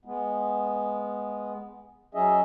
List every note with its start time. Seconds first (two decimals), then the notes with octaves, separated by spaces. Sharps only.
0.05 G#3 B3
2.15 F#3 C#4 G#4 D#5 E5